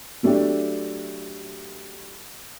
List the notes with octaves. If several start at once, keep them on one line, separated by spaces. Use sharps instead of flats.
F#3 A3 D4 G4